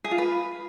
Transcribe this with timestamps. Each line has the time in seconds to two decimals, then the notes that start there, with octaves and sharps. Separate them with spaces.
0.04 G#4
0.11 F4
0.18 B4